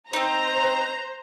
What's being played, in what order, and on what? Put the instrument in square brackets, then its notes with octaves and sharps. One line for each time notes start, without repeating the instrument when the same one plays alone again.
[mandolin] C4 D#4 [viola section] C5 [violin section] A#5